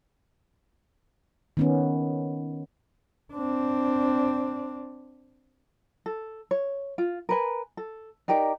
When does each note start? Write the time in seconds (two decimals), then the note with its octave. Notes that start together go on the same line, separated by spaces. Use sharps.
1.57 D#3 B3 C#4
3.33 C4 D4
6.06 A4
6.51 C#5
6.98 F4
7.29 A#4 B4 G#5
7.77 A4
8.28 D#4 G4 A#4 D5